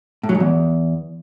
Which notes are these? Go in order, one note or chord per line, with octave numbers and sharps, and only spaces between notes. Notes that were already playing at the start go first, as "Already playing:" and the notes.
A2
F#3
G#2
E2